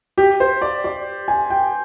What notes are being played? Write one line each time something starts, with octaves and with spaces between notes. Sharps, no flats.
G4
C5
D5
D5
G#5
G5